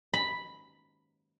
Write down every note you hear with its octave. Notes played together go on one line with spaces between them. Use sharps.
B5